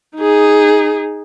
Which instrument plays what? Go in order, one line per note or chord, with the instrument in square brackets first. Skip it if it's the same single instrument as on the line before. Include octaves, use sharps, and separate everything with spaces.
[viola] D#4 G#4